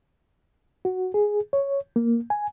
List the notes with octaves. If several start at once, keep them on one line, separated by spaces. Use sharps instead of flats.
F#4
G#4
C#5
A#3
G#5